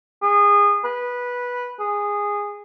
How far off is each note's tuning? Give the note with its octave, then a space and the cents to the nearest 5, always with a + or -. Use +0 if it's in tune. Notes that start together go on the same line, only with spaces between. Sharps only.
G#4 -25
B4 -10
G#4 -15